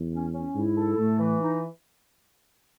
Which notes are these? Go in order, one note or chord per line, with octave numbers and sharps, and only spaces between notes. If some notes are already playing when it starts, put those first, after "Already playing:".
Already playing: E2
C#4
C#4
G#2 E4
A4
A2 A3
E3
D#4